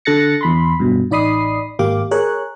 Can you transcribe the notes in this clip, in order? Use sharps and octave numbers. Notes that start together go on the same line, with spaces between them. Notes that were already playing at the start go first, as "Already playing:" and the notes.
D3 A4 F#6 A6 A#6 C#7
E2 B5 C6
G2 B2
A1 D#4 D5 B5 D#6 C7
G#1 A#3 G4 F5 D6
G#4 A#4 C#5 F#6